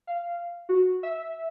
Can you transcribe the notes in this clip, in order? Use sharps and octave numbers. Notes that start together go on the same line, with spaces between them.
F5
F#4
E5